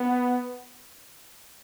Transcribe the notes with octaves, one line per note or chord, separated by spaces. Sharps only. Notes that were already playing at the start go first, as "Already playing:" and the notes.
Already playing: B3